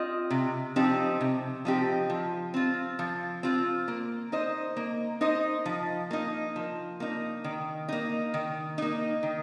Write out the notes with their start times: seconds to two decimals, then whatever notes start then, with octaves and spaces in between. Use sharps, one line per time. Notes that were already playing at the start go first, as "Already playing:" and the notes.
Already playing: C4 F4 D#5
0.31 C3
0.76 F3 C4 D#4 G4
1.21 C3
1.65 F3 C4 D#4 G4
2.10 F3
2.54 C4 F4
2.99 F3
3.43 C4 F4
3.88 A#3
4.32 D#4 C5 D#5
4.77 A#3
5.21 D#4 C5 D#5
5.66 F3
6.11 A#3 D#4
6.56 F3
7.00 A#3 D#4
7.44 D#3
7.89 A#3 D#4
8.34 D#3
8.78 A#3 D#4
9.23 D#3